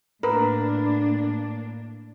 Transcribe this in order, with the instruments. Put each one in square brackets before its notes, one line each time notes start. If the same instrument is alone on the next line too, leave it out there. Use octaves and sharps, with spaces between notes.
[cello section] A2 A#3 D4 [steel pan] A#4 B4